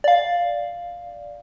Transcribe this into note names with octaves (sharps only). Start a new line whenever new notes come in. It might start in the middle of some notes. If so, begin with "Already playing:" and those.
D5 F5